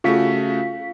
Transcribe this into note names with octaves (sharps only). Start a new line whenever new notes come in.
C#3 A3 F4 F#4 F5 B6